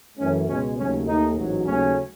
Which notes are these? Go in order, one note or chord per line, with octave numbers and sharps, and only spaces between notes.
F#2 E3 A3 C#4
C#2 B2 G#3 C#4
D#2 C#3 F#3 A3 C#4
D#2 D#3 A3 D#4
A1 G#2 F#3
D#2 C#3 F#3 A3 C#4